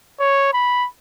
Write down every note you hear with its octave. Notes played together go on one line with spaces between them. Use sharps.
C#5
B5